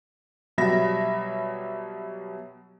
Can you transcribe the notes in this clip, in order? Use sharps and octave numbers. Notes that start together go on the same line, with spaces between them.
B2 F#3 G3 E5 B5 A#6